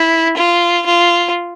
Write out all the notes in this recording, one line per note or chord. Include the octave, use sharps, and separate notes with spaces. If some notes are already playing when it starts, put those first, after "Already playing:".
Already playing: E4
F4
F4